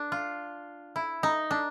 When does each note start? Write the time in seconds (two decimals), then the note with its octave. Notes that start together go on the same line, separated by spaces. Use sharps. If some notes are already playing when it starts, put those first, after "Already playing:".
Already playing: D4
0.12 F4
0.96 E4
1.23 D#4
1.51 D4